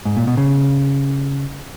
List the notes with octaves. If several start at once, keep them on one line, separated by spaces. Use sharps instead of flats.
G#2
A#2
B2
C#3